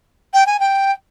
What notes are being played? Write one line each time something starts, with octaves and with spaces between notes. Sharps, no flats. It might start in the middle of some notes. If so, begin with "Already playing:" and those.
G5
G#5
G5